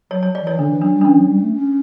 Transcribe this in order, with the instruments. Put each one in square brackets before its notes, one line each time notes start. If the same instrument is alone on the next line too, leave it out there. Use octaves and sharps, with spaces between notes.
[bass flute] F#3 [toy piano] C#5
[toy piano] C#5
D5
[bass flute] E3 [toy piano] C#5
[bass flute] D3 [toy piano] D4
[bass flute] E3
[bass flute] F#3 [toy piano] D4
[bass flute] G3
[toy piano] D4
[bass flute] E3 [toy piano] C#4
[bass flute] F#3
G3
A3
C#4